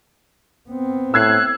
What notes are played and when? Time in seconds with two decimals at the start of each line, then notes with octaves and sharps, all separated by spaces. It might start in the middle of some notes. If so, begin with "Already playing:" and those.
0.69 B3 C4
1.14 A2 E6 F#6 G#6 C7